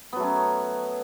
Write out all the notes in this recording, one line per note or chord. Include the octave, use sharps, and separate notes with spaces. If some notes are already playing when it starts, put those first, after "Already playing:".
F#3 A3 B3 C#4